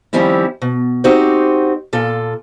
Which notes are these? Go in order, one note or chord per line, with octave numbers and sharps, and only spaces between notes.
D#3 F3 G3 C4 C#4 E4
B2
C4 D#4 F#4 G4 C5
A#2 F4 A4